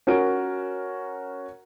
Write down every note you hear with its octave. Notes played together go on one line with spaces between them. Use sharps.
C#4 F#4 A#4 D7